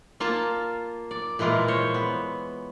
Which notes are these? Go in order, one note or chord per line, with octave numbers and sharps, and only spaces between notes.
A#3 F4 A5
D5
A#2 E3 G#3 F4
C5 C#5
B3